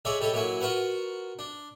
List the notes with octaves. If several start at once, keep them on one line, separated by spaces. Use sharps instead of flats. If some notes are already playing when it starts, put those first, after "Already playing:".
G#3 C#5 D5 E5 G#5 A#5
G3 A4 C#5 D#5
F#3 A#3 E4 F#4 G#5
F4 F#4 A#4 B4 F#5
D4